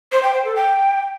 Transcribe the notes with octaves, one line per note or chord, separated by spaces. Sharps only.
C5
G5
C5
A4
G5